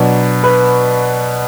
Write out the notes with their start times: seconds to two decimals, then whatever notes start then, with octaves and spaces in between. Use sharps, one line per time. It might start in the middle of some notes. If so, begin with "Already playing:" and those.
Already playing: B2 F#3 D4
0.44 B4